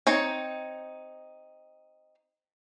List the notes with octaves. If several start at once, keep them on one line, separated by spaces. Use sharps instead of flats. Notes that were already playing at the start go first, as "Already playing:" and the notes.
C4 D#4 C#5